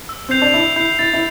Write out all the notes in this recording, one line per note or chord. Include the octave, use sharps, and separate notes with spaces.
E6
C4 G6 C7 F7
D4
E4 E6
E4 G6 C7 F7
E4 A6
E4